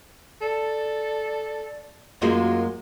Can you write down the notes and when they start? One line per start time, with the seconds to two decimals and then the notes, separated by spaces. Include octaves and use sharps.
0.41 A4 D5
2.22 F#2 G#3 A#3 F4 F#4